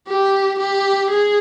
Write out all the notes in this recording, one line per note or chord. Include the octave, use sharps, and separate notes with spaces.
G4
G4
G#4